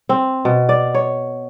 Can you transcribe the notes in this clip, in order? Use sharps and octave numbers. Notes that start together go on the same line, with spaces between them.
C4
B2
D5
C#5